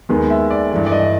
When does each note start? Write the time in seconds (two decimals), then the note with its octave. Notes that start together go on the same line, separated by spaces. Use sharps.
0.09 D#2 D#3 G#3 B3
0.30 E5
0.50 D5
0.71 G2 E3 A3 D5
0.86 D5
0.92 D#5